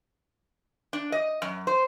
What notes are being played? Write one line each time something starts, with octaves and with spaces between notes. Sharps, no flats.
D4
D#5
F#2
C5